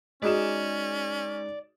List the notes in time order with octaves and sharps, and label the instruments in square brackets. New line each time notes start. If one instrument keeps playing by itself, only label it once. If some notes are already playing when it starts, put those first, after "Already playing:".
[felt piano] G#3 D#4 E7 [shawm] C#4 [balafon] F#4 G#4 D#5 [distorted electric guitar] D5